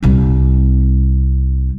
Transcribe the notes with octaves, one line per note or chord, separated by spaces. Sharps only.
C2 C4